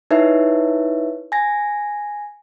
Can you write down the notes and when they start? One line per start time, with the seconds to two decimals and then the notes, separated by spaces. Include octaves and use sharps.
0.11 D#4 E4 B4 C#5 E5
1.32 G#5 A#6